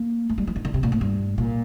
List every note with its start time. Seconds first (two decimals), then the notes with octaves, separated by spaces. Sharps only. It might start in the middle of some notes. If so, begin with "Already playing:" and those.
Already playing: A#3
0.29 A3
0.38 G3
0.47 F3
0.56 D#3
0.65 D3
0.74 C3
0.83 A#2
0.92 A2
1.01 G2
1.38 A#2